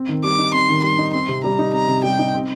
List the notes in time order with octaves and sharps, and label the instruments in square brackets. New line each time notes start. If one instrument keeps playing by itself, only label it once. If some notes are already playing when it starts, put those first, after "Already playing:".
Already playing: [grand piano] C4
D#3
[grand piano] G3 [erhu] D6
[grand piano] D#4
[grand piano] C4 [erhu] C6
[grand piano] D#3
[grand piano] G3 [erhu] C6
[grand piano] D#4
[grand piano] C4 [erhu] C6
[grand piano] C3
[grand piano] G3 [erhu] A#5
[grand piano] D#4
[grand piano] C4 [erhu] A#5
[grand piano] C3
[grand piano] G3 [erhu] G5
[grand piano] D#4
C4